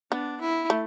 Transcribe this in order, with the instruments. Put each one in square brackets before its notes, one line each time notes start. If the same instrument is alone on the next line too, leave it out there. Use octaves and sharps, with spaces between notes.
[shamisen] B3 [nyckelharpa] D4
[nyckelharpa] E4
[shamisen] A3